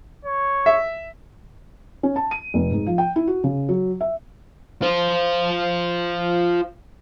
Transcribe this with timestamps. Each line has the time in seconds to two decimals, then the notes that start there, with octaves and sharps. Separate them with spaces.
0.25 C#5
0.66 E5
2.03 C#4
2.16 A5
2.31 D#7
2.54 F1
2.72 G#2
2.87 F3
2.98 G5
3.16 E4
3.27 F#4
3.44 C#3
3.69 F#3
4.01 E5
4.82 F4 C5